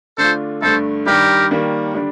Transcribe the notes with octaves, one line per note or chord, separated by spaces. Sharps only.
D3 A3 D4 F4 A4 C5
G2 D3 A3 A4 C5
G2 D#3 G3 G4 A#4
D#3 G3 A#3
D3 G3 D4